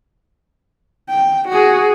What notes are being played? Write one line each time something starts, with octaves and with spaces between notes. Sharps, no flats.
G5
F#4 G#4